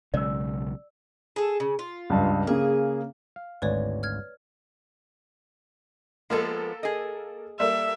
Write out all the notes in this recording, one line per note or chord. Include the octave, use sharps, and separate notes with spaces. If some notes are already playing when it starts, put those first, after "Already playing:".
B1 C#3 G#3 D5 E6
G#4 A4
C#3
F4
C#2 G2
C#3 A#3 G#4
F5
G#1 D2 B4 C#5 D5 G#5
F6 G#6
F3 G#3 A#3 B3 A4
G#4 D#5
G3 A#3 A4 E5